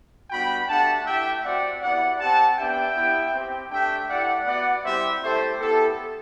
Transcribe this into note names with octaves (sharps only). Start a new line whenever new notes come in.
G3 B3 D4 F#4 G5 B5
A3 D4 G4 F#5 A5
A3 E4 G4 E5 G5
C4 F#4 D5 F#5
B3 E4 G4 D5 F#5
C4 G4 F#5 A5
B3 D4 G4 E5 G5
B3 E4 G4
C4 G4
A3 D4 G4 E5 G5
A3 E4 G4 D5 F#5
B3 F#4 D5 F#5
G3 C4 E4 G4 C5 E5
A3 E4 G4 A4 C5
B3 E4 G4 A4